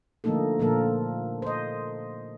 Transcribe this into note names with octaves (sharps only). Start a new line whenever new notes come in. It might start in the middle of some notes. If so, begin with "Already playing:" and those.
D3 F3 A3 A#3 D#4 A4
A#2 D3 F3 A#3 A4 A#4
C5 D#5